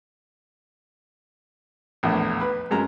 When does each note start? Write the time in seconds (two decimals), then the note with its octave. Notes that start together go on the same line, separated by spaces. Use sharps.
2.03 A#1 E2 A2
2.41 B4
2.71 F#2 G#3 A#5